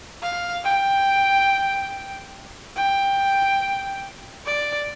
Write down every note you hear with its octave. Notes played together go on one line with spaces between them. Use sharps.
F5
G5
G5
D5